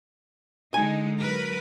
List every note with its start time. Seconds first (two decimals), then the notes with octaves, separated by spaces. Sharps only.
0.74 D3 G#3 D#4 G#5
1.19 F#3 A#4 B4